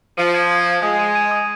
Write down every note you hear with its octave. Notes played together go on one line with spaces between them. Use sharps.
F3 D#7
G#6
G#6
G#6
G#3 D#6
D#7
D#7
D#6